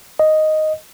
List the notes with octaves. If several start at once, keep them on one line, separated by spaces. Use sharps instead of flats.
D#5